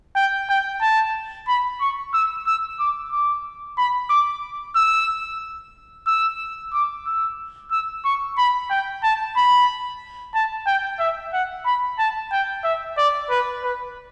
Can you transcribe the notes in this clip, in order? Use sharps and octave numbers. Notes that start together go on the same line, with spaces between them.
G5
G5
A5
B5
C#6
E6
E6
D6
D6
B5
D6
E6
E6
D6
E6
E6
C#6
B5
G5
A5
B5
A5
G5
E5
F#5
B5
A5
G5
E5
D5
B4
B4